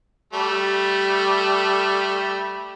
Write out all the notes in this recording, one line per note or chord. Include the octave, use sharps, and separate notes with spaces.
G3 A3